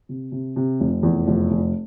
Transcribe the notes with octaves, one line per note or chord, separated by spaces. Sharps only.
C3
C3
C3
F1
E2
F1
F1